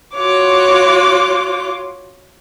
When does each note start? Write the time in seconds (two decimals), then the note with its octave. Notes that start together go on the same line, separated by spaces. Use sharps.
0.14 F4 F#4 C#5 D6